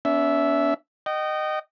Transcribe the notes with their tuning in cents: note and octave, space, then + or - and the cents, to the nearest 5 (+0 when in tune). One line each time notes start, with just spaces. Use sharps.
B3 +0 D4 -45 E5 +0
D#5 -15 G5 -35